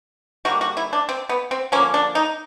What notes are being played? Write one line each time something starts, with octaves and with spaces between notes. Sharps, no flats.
D3 G3 A#3 F#4
F#4
E4
D4
C4
B3
C4
D3 F3 A#3 C#4
D4
D#4